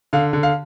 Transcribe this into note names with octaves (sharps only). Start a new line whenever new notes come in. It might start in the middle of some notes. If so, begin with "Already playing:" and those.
D3 F5
D3
F5